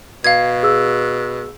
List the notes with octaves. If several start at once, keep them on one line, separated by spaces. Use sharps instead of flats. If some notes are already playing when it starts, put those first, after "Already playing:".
B2 F5 G#6
G#4 E6